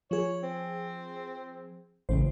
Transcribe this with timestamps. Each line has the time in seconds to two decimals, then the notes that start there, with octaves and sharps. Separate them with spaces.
0.11 F3 G#4 C#5
0.43 C4
2.09 A1 C#3 G#3 C5